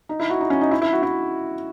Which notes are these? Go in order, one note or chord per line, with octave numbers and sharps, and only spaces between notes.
D#4
E4
F#4
D#4
C#4
D#4
E4
E4
F#4
E4